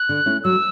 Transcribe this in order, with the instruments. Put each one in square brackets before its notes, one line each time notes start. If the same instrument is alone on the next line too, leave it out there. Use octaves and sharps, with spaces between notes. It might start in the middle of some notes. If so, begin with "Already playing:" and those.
Already playing: [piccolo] F#6
[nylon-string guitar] D3
A3 C#4 E4
[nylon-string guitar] F#3 [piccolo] E6